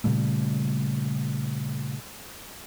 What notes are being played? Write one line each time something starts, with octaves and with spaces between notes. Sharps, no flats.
A#2 C#3 G3 A3